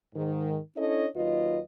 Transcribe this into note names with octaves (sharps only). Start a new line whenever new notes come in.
G#2 D#3
C#4 D4 E4 A4 C#5 D#5
D#2 F#3 F4 B4 D#5